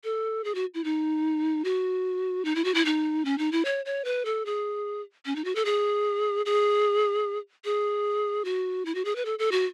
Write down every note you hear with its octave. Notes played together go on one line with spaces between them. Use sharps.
A4
G#4
F#4
E4
D#4
F#4
D#4
E4
F#4
E4
D#4
C#4
D#4
E4
C#5
C#5
B4
A4
G#4
C#4
D#4
F#4
A4
G#4
G#4
G#4
F#4
E4
F#4
G#4
B4
A4
A4
F#4